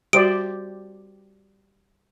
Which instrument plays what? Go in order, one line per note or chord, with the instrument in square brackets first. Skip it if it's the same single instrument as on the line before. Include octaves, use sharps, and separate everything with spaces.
[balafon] G3 F#4 [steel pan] G4 C5 D5 [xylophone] D7